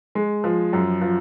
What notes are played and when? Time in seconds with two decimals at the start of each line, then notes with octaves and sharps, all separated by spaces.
0.15 G#3
0.44 F3
0.73 F#2
1.01 F3